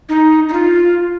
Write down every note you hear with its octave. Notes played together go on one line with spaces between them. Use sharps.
D#4
D#4
F4